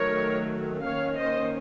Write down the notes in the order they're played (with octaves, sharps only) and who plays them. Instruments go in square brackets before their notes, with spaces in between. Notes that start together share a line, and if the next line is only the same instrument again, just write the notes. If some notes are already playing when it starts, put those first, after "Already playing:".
Already playing: [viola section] D#3 F#3 A3 A#4 C#5
D#3 A#3 C#4 C#5 F5
C5 D#5